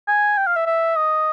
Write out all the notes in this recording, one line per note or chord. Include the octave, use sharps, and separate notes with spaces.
G#5
G5
F5
E5
E5
D#5